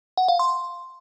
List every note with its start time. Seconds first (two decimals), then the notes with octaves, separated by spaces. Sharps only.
0.17 F#5
0.28 F5
0.39 C6